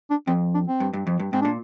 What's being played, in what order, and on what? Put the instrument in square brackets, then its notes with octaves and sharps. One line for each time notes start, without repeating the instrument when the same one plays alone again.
[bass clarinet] D4
[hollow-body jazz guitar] F2 [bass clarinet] C4
[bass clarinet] D4
C4
[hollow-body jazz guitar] G2
G2
F2
G2
[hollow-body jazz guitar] G#2 [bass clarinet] C4
[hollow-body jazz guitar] A#2 [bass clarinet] D4